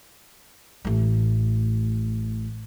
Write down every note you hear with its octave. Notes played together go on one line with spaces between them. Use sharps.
A1 A3